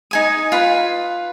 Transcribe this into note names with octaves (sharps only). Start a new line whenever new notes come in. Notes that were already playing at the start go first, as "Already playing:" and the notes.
D#4 G#5 D#6
F4 B4 B5